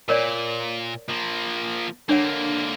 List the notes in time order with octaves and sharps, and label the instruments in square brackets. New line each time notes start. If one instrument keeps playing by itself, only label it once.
[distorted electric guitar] A#2 [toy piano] A#4 C#5 D5
[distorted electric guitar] F3 A#3
[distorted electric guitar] D3 A#3 [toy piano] D4 C#5 F#5